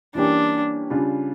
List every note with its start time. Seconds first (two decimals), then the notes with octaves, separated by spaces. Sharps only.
0.15 E3 G3 A#3 C#4 D4 G4
0.90 C#3 G3 D4 F4